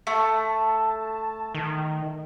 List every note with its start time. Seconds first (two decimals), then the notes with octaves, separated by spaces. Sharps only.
0.07 A3 A5
1.54 D#3